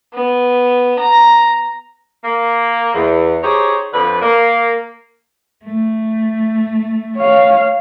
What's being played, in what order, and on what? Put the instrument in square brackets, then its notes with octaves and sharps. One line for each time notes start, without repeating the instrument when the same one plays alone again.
[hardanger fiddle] B3
A#5
[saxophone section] A#3
E2
D#4 G4 G#4 C5 C#5
F2 D3 F3 B4
A#3
[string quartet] A3
[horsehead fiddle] C#5 F5